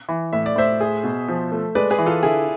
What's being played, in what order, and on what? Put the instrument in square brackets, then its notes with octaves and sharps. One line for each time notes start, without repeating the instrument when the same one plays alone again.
[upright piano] E3
[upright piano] A2 [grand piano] E5
[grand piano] D5
[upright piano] A2 [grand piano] C5 E5
[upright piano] G#4
B2
F3
A3
[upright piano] G#3 [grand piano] B4 D5
[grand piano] G#4 B4
[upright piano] E3
[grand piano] F4 A4
[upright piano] D3 [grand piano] E4 G#4